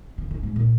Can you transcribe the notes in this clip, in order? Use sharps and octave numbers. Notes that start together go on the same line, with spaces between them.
C#3
C#3
G#2
A#2